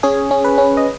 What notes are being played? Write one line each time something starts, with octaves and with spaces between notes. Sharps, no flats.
C#4 G#4
C#4
B4
C#4
D#5